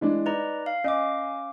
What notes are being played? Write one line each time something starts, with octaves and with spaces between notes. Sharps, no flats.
E3 G#3 D4
D#4 B4 D5 A#5
F5
C#4 D#5 F5 D6